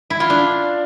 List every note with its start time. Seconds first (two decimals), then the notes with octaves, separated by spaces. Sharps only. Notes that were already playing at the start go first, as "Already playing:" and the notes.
0.10 E4
0.20 F4
0.30 D4